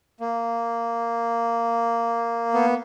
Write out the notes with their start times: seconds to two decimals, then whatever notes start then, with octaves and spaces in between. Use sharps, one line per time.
0.20 A#3
2.54 B3